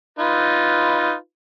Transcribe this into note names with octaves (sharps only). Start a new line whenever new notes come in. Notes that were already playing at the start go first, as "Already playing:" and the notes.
D#4 F4 B4